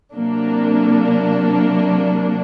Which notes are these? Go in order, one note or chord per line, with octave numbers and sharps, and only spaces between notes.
C3 F#3 A#3 D4